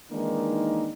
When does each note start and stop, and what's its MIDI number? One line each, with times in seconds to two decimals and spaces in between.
0.12 0.93 51
0.12 0.93 52
0.12 0.93 56
0.12 0.93 58
0.12 0.93 62
0.12 0.93 63